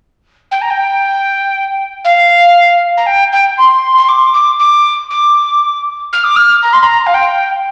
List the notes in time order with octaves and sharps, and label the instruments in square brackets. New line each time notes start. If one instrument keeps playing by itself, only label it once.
[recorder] G5
A#5
G5
F5
A#5
G5
G5
C6
C6
D6
D6
D6
D6
F6
D6
F6
A#5
C6
A#5
F5
G5